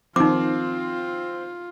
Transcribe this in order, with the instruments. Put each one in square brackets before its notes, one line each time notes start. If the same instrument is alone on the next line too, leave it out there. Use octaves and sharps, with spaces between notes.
[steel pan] D#3 F3 [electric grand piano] C4 [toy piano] D#4 D6 [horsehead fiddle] F4